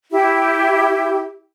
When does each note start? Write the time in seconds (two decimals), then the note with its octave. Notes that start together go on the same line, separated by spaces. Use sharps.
0.11 E4 G4